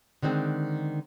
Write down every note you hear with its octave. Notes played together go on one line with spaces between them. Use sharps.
D3 D#3 G#3 C4